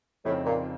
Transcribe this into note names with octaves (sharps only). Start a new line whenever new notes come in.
F2 A2 C#3 F3 C4 D#4
A#2